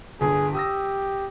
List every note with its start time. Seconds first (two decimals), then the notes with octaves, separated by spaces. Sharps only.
0.21 G1 D3 G#4
0.54 G4 D#6 E6 A#6